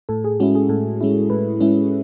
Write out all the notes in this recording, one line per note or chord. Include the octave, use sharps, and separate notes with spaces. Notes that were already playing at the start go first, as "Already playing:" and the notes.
A2 A4
G#4
G#3 C#4 E4 F#4
G#4
A2 A4
G#3 C#4 E4
A2 B4
G#3 C#4 E4